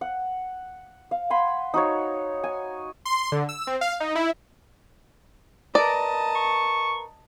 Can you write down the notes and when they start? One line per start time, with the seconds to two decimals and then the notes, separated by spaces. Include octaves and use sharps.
0.01 F#5
1.11 F5
1.30 F#5 G#5 B5 C6
1.74 D#4 F#4 C#5
2.44 G#5
3.05 C6
3.32 D3
3.49 E6
3.67 C4
3.81 F5
4.00 D#4
4.15 E4
5.75 A#4 B4 D5 D#5 A5
6.36 C#6